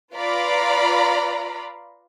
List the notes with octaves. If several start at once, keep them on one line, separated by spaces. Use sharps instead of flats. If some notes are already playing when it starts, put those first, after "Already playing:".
F4 B4 D5 F5 A#5 B5